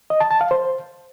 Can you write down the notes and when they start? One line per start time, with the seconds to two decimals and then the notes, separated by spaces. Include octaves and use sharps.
0.10 D#5
0.20 A5
0.31 A5
0.41 F5
0.51 C5